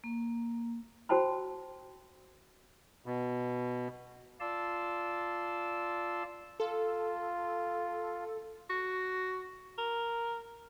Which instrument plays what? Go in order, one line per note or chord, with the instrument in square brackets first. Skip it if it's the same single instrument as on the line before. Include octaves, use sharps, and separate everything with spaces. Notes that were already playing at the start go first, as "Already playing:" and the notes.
[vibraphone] A#3
[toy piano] F#4 C5 G5 A5 B5
[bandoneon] B2
[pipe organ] F4 D5 A5 C6 E6
[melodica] F4 [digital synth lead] A4
[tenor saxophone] F#4
A#4